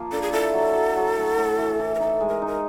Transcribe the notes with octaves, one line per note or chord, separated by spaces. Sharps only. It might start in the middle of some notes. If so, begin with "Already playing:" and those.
Already playing: F3 A#3 F4
D4 A4
G#4
E4 A4
F#3
F#3
F#3
A2
A2
E3
E3
A#4
D#4 A4
G#3
A#4
D#4 A#4